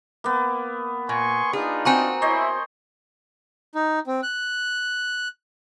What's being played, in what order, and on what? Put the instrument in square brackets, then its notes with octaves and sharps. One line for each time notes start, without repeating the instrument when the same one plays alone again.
[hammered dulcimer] A#3 B3
[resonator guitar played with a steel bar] A#2 [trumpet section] G#5 C6 C#6
[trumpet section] D4 D#4 F4 [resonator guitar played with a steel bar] G#4
[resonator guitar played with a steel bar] C4 F#4 [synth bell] G#5 A#5 C#6
[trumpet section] E4 [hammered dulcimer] C5 C#5 D#5
[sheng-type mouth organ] D#4
C4
F#6